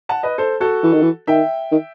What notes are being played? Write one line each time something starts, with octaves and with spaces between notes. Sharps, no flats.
F#5 A5
B4 D#5
A4 C5
F#4 A4
E3
D#3
E3
D#3 E5 G5
D#3